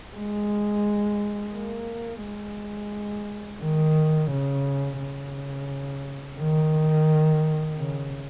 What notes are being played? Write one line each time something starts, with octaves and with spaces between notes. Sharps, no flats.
G#3
A#3
G#3
D#3
C#3
C#3
D#3
C#3